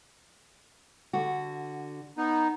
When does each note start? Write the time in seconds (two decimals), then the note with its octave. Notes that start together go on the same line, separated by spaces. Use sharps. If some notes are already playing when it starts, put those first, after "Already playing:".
1.13 D3 F#4
2.17 B3 D#4